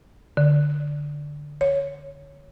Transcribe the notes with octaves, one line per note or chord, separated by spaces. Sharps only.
D3
C#5